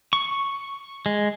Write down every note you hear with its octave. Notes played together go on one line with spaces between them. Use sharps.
C#6
G#3